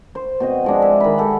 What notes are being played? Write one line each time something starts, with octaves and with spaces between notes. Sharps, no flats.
C5
B2 C4 D#5
F3 G#3 D4
E5 G#5
D#3 B5
G4 A4 F#5